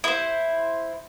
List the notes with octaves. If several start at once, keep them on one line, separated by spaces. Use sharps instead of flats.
E4 C5